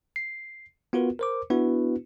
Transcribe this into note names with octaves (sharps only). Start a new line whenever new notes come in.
C7
B3 F4 F#4 A#4 B4
A#4 C5 D6
B3 D4 E4 F#4 B4